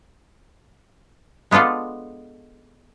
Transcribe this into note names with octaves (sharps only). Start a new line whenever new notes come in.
G#3 B3 D4 F4 A4